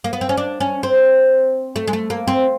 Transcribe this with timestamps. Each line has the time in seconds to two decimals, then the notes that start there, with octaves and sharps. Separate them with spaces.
0.04 A#3
0.13 B3
0.21 C4
0.29 C#4
0.37 D4
0.60 C#4
0.83 C4
1.76 A3
1.88 G#3
1.93 A3
2.10 A#3
2.27 C4